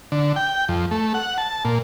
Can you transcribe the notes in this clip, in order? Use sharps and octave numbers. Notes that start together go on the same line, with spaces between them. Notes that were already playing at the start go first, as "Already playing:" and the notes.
D3
G5
F2
A3
F#5
A5
A#2